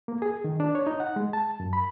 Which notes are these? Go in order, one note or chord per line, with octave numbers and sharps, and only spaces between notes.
A#3
G#4
D#3
D4
C#5
D#4
F#5
G#3
A5
F#2
B5